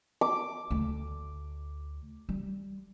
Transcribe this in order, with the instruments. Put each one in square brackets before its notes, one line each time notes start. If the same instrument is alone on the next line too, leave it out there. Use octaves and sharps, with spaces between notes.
[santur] D6
[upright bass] D2
G3